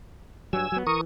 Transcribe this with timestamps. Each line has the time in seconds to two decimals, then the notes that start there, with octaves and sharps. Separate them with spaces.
0.53 G2 F#3 G#5 E6
0.72 F#3 B3
0.87 E3 A#4 C#6 D#6